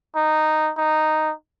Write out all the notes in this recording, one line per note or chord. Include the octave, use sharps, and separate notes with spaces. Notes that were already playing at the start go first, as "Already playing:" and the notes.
D#4
D#4